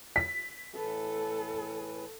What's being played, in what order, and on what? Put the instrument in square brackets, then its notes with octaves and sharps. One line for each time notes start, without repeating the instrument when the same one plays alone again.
[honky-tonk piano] B6
[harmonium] A2 E3 B4 [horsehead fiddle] A4